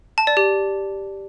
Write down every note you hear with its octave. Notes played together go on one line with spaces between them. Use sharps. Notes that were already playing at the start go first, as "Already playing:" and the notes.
A5
D5
G4